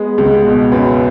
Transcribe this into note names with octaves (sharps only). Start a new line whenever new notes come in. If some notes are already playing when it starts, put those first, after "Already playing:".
Already playing: G#3 B3
C#2
B2
F#2 B4